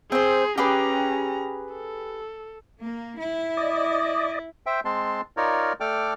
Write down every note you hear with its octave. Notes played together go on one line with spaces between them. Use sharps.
C4 G#4 C5
C#4 G4 G#4 B4 A#5
A4
A#3
E4
D5 D#5
C5 E5 G5
G#3 C4 A5 C6
D#4 F4 A#4 C#5 D5
A3 A4 D5 G5 D6 F6